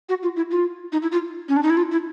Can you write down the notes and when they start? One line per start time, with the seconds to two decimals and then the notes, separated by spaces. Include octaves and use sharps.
0.09 F#4
0.23 F4
0.37 E4
0.51 F4
0.92 D#4
1.02 E4
1.12 F4
1.49 C#4
1.57 D4
1.63 D#4
1.70 E4
1.77 F4
1.91 E4